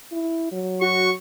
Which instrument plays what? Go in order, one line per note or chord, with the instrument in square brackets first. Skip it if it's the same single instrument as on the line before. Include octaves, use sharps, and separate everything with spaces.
[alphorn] E4
F#3
[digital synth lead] F#4 [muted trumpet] C#6